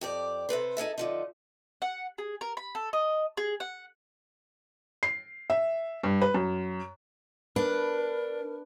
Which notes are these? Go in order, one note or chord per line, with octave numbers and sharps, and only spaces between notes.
F2 G4 D5
C3 A4 B4 C5
D#4 G#4 A4 E5
D3 F3 D#4
F#5
G#4
A#4
B5
A4
D#5
G#4
F#5
C7
E5
G2
B4
F#2
D4 A#4 B4